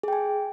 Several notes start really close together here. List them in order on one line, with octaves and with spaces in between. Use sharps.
G#4 G5 G#5